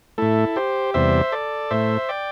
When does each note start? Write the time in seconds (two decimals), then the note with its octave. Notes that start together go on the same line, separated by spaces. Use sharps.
0.18 A2 A3 E4 A4
0.56 G4 C5
0.94 E2 C3 G3 C5 E5
1.32 A4 D5
1.71 A2 A3 C5 E5
2.09 D5 G5